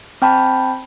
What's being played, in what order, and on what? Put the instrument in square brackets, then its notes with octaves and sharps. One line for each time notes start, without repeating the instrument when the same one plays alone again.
[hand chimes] C4 G5 A5 B5